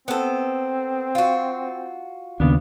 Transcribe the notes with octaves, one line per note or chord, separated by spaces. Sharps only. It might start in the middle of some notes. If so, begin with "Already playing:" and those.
B3 C4 A4
F4 F#4
D#2 C#3 B3 D4